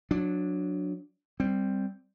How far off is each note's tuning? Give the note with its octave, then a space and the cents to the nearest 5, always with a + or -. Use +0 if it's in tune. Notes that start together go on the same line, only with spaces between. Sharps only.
F#3 -20 D4 +0
G3 +0 C4 +0